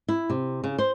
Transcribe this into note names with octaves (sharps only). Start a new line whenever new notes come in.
E4
C3
C#3
C5